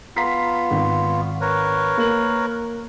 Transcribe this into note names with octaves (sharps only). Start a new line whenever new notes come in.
B3 F4 A#5 B6 C7
G#1
A#4 B4 C#5
A#3 F#7